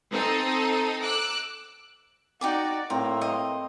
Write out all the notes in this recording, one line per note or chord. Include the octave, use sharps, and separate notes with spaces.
C4 D#4 A4 D#6
D6 E6 F#6
D#4 F#4 D5 G5 D6
A2 A#3 C4 A#5
C5 D#5 A#5